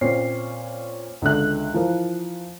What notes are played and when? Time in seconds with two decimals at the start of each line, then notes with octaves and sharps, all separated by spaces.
0.01 A#2 C4 C#4 C5 C7
1.22 C#2 D3 E5 F#6
1.73 E3 F3 A#4 C5